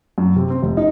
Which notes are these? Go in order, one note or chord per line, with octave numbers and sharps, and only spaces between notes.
F#2
C3
C4
F1
D#4